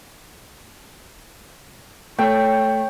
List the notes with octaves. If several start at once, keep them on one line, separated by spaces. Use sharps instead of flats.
A3 C#5 G5